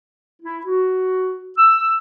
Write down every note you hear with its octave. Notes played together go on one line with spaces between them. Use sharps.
E4
F#4
E6